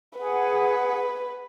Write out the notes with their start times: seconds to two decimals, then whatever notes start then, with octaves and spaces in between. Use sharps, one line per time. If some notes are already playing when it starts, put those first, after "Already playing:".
0.18 G#4 B4 F#5